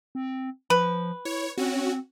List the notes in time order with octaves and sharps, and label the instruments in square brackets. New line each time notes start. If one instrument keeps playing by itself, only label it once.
[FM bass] C4
[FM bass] F3 [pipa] B4
[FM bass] E4 [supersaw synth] C#5
[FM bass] C4 [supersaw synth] C#4 F#4